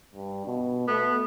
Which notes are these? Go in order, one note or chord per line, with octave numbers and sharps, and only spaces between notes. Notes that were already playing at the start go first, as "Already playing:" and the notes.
G2
B2
A3 B3